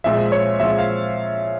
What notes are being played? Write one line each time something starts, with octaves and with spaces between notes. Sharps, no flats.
A#2 F3 G#3 C4 F4 E5
C#5
A#2 F3 G#3 C4 F4 E5
F5